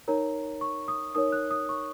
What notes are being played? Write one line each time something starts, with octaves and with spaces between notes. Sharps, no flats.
D#4 A#4 C#5 A#5
C#6
D#6
D#4 A#4 C#5 D#6
F#6
D#6
C#6